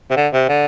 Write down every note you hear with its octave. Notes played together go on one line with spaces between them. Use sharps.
C3
D3
C3
D3